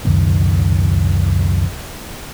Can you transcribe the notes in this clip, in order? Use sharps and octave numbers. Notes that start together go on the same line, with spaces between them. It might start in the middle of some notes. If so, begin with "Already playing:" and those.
C#2 F#2 B2 D#3